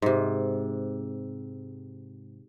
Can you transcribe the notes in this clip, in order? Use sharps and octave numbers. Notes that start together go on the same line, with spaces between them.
G#2 C3